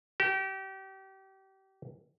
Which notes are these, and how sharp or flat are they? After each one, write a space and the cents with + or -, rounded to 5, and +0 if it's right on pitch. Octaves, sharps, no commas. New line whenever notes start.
G4 -30